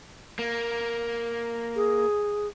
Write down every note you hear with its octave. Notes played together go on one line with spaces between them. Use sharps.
A#3
G#4